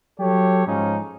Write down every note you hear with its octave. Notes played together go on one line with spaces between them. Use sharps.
F#3 G4 A4 C#5
G#2 F3 C#4 D#4